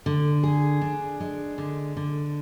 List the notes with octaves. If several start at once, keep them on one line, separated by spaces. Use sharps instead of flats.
D3
G#4
D4
G#3
D3
D3